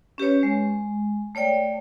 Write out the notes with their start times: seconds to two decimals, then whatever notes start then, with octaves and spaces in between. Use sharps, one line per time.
0.18 C#4 G4 B4 C#5
0.43 G#3
1.35 A3 C#5 D5 G5